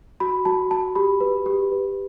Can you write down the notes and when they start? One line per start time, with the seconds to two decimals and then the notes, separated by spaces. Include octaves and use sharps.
0.20 F#4 B5
0.45 F#4 A5
0.71 F#4 A5
0.95 G4 B5
1.20 B4
1.46 G4
1.72 B4